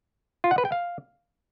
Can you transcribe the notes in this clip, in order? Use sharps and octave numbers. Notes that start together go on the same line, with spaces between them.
F4
F#5
B4
G5
F5